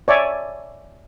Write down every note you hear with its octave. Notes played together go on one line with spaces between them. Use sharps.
C#5 D5 E5 G#5